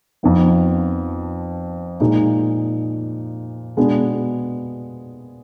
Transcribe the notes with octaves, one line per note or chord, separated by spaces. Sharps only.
F2 F3 B3 D#4
A#2 G#3 D#4
B2 G#3 B3 D4 G#4